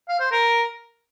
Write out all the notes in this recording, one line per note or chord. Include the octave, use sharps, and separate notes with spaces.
F5
C5
A#4